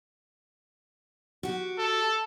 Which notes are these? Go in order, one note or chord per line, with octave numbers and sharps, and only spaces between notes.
F#4 G4
A4